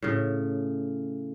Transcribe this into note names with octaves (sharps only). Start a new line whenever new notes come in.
A2 C#3